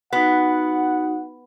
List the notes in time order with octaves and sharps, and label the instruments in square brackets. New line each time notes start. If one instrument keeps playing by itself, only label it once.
[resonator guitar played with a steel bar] B3 [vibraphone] D#4 F#4 [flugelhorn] F#5